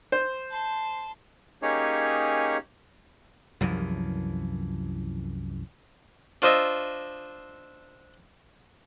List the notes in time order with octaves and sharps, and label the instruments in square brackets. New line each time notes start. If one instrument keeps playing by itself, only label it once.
[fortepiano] C5
[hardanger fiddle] A5 C6
[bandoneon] A#3 C#4 D#4 G4 G#4 C#5
[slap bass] C2 F#2 E3 F3
[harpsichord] D4 F4 C5 D#5 E5